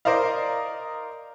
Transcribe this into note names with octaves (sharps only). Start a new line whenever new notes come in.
A#4 C5 D5 D#5 F5